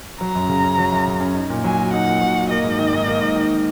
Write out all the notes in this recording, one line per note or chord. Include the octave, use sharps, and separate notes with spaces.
F#3 A#5
F#2
C#3
C#4
F#3
F#2
C#3
C#4
D#4
A#2
F#3 G#5
F#4
D#4 F#5
A#2
F#3
F#4
A#3 D#5
G#2
D#3
G#2
A#3
G#2
D#3